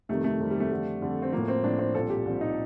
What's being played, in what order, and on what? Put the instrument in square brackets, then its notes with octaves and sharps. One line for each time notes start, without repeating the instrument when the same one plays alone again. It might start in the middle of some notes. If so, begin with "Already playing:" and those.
[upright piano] F2 C3 D#3 G3 A3
A3
F2 C3 D#3 G3
G3
A3
F2 D3 G3
F2 D3 G3
C4
A2 F3 A#3
C4
A2 F3 D4
C4
C2 A#2 F3 A4
G4
C2 A#2 F3
D#4